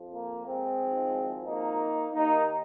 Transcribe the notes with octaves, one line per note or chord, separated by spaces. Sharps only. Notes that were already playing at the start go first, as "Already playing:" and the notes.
Already playing: F2 F3
A#3
G#3 C4
G#1 G#2 F3
A#3 D#4
D#2 D#3 A#3 D#4